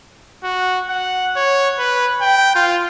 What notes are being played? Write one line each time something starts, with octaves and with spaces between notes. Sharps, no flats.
F#4
F#5
C#5
B4
G5
F4